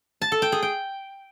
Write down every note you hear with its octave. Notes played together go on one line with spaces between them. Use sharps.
A5
A4
G5
G#4
G5